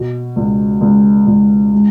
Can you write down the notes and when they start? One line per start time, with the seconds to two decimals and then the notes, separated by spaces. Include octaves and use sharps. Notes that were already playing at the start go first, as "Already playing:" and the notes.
Already playing: B2
0.36 C#2
0.81 C#2
1.26 C#2
1.73 G#3